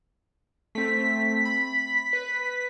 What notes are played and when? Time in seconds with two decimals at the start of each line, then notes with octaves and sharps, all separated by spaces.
0.75 A3 C4 B6
1.45 B5
2.13 B4